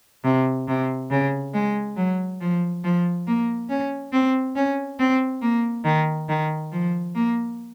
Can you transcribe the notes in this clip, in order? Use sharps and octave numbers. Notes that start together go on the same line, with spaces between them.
C3
C3
C#3
G#3
F#3
F3
F3
A#3
C#4
C4
C#4
C4
A#3
D#3
D#3
F3
A#3